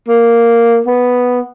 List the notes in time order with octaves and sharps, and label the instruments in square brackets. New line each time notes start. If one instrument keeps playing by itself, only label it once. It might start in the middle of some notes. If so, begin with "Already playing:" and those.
[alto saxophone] A#3
B3